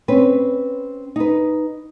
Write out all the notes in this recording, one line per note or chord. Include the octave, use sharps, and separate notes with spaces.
C4 C#4 B4
D#4 B4